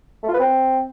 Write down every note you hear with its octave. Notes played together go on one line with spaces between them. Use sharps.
A3
F4
B4
C4